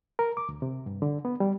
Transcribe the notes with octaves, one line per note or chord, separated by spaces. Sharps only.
A#4
D6
D2
C3
G2
D3
B3
G3